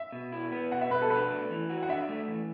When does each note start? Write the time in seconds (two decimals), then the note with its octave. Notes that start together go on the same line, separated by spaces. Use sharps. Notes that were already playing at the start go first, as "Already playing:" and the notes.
Already playing: E5
0.12 B2
0.32 E4
0.52 B3
0.71 B2 F#5
0.81 E5
0.91 B2 B4
1.02 A4
1.10 D4 B4
1.30 A3
1.50 E3
1.70 F#4
1.83 F#5
1.89 D4 E5
2.09 A3
2.28 E3